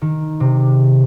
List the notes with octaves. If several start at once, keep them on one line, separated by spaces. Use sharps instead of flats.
D#3
C3